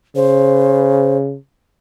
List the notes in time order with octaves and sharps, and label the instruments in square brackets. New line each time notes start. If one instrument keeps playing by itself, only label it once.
[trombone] C#3 [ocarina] C5